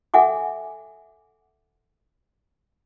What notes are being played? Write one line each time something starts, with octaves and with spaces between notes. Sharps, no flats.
A4 E5 F#5 G#5 D6